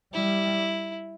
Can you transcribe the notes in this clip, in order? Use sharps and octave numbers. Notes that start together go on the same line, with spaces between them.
G3 E4